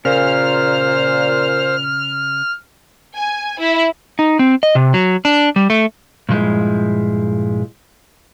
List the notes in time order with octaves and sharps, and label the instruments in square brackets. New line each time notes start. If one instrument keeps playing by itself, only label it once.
[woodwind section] A#2 [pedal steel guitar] C#3 [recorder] C5 [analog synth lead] F6
[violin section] G#5
E4
[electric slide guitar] D#4
C4
D#5
C3
F#3
D4
G3
A3
G2 A#2 F3 G#3 E4